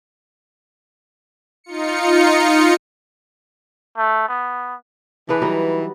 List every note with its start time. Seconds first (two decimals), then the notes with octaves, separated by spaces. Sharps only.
1.64 D#4 F4 C#7
3.98 A3
4.29 B3
5.29 E3 D4 G#4 B4
5.42 F#3 G3 D#4